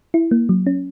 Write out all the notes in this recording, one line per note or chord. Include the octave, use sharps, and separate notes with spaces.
E4
A#3
F#3
C#4